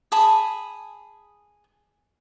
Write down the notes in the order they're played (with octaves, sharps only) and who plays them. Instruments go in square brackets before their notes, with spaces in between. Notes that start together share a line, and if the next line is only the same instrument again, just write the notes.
[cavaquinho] G#4 A5 B5 D#6